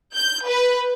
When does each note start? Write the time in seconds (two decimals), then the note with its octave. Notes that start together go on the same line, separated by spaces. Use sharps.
0.15 G6
0.46 B4